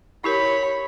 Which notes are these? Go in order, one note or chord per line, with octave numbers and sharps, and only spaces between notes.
E4 G4 A#4 C#5 B5